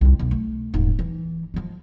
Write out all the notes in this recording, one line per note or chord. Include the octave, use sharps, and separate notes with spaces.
C2 F2
B1
A3
D#1 G#2
E3
F3 G#3